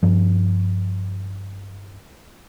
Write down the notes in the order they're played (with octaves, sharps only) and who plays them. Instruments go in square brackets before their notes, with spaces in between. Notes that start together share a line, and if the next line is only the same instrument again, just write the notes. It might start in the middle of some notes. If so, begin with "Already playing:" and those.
[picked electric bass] G2 F3